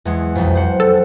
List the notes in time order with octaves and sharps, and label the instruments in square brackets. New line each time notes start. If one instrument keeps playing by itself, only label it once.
[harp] E2 G#3 F#5
B1 F2
C5 F#5
[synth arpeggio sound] A4